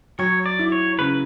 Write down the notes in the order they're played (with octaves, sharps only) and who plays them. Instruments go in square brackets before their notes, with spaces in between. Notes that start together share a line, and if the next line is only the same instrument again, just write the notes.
[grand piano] F#3 [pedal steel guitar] C#5
[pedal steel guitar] D5
[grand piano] E4
[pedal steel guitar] C#5
[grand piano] C#3 [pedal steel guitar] B4